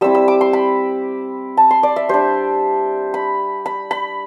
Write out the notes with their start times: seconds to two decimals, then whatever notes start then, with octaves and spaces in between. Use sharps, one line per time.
0.01 G3 C4 E4 E6
0.15 E6
0.28 D6
0.41 C6
0.53 B5
1.57 A5
1.71 C6
1.83 D5
1.96 E5
2.09 G3 D4 C5
3.14 B5
3.66 B5
3.91 B5